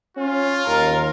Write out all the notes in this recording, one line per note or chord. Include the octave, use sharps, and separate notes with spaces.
C#4 F4
D#2 A#4